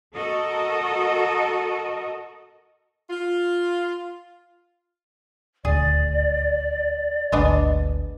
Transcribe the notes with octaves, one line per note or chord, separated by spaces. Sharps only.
F#4 A4 A#4 D#5
F4
D#1 D2 G#4 D5
G#1 D2 G#3 B3 D4